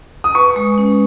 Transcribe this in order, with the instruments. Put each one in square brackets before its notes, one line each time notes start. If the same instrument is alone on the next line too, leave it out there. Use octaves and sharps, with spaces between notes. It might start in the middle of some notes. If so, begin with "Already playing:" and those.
[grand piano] D#6
[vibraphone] B4 [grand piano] C#6
[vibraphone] G#3
C#4